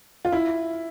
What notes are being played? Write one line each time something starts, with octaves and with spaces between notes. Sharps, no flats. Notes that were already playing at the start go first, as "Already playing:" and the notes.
F4
E4